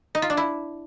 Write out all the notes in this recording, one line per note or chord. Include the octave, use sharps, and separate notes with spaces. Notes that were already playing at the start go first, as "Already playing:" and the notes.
D#4
F4
D4
E4